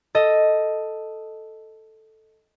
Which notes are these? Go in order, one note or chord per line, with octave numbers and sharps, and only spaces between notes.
A4 D#5